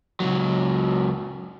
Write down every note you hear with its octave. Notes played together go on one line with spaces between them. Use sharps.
C#2 F#3